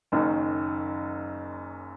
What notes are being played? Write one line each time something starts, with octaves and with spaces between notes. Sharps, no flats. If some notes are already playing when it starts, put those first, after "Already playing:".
F#1 F#2 D#3